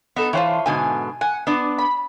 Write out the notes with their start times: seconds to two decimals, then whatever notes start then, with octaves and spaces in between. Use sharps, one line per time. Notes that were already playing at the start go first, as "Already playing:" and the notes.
0.16 B3 D#4 A4
0.33 E3 F4 C5 C#5 F#5 A5
0.66 G#2 B2 D3 G#5
1.21 F#5 G#5
1.47 B3 D4 D5
1.78 B5